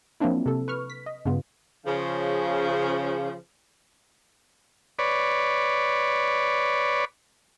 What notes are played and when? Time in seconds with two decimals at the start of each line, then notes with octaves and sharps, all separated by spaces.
0.20 F3 F#3 A#3 C4 D4 E4
0.46 C3 A4
0.68 B4 C#6 F6
0.90 B6
1.06 D#5
1.25 G2 C#3 B3 F4
1.85 C#3 F3
4.99 B4 C#5 D5